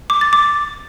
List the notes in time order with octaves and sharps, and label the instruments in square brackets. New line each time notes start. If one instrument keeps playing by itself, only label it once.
[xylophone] D6
A6
D6